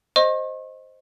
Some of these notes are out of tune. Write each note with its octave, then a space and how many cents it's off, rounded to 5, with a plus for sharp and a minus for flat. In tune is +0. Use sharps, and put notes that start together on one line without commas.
C5 +0 D#5 +0 C#6 -45